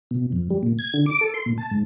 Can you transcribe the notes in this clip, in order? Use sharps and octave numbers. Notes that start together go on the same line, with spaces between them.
B2
F2
G3
A#2
G#6
D3
D6
A4
C6
A#2
A5
G#2